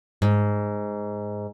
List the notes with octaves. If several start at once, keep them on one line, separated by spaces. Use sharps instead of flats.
G#2